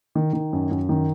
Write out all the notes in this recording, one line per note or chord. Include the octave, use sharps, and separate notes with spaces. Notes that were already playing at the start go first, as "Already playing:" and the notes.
D#3
D#3
F#2
F#2
D#3